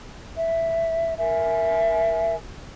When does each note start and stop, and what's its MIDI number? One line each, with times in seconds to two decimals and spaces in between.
0.35 1.12 76
1.17 2.35 70
1.17 2.35 76
1.17 2.35 80